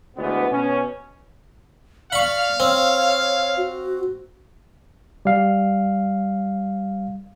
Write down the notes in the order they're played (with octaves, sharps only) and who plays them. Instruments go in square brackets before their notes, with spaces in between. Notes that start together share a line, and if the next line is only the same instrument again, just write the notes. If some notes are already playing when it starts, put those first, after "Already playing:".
[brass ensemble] D2 E3 G#3 B3
B2 C#4
[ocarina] D5 [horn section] F5 [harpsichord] B5 C#6
[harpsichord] C4 [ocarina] C#5
[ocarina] F#4
[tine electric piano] G3 F5